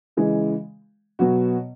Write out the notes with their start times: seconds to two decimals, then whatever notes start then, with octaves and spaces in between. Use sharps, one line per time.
0.17 C#3 E3 G#3
1.19 B2 F#3 B3 F#4